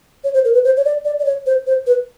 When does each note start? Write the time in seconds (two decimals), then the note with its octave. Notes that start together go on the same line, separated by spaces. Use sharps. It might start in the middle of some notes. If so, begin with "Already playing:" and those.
0.24 C#5
0.34 C5
0.45 A#4
0.54 B4
0.64 C5
0.77 C#5
0.85 D5
1.05 D5
1.19 D5
1.25 C#5
1.46 C5
1.67 C5
1.87 B4